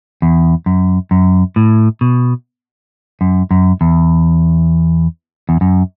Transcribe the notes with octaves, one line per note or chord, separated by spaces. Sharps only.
E2
F#2
F#2
A2
B2
F#2
F#2
E2
E2
F#2